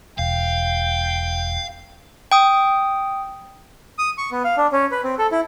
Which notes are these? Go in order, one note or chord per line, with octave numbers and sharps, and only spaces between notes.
E1 F5 G5
G5 D#6
D#6
C#6
B3
F5
D4
C#4
B4
C4
A4
E4